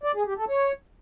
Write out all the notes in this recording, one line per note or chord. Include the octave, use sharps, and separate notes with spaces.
D5
G#4
G4
A4
C#5